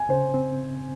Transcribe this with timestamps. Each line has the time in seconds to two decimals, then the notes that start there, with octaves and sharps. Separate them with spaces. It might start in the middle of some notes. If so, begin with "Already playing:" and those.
Already playing: G#5
0.09 C#3 C5
0.34 C4